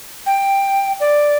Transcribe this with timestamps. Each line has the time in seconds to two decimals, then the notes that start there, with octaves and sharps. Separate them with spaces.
0.26 G5
1.00 D5